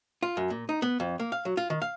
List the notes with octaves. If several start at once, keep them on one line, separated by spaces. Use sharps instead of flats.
F4
F#2
A#2
D#4
B3
F2
A#3
F5
F#3
F4
D#3
F5